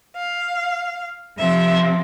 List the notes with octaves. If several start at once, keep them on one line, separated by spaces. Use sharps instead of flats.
F5
C3 F3 C4 E5